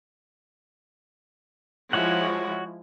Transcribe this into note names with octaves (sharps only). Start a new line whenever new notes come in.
F3 G#3 E4 F#4 C#5 F#5